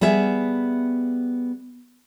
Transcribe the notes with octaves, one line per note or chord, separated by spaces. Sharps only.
G3 B3 G#4 E5